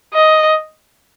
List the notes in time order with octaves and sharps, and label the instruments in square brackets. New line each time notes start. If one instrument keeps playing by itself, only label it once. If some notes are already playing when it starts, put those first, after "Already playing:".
[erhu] D#5